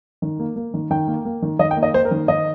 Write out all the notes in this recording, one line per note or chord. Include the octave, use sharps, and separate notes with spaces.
D#3
A#3
A#3
D#3
D#3 G5
A#3
A#3
D#3
D#3 D#5
G5
A#3
D#5
A#3 C5
A#4
D#3
D#3 D#5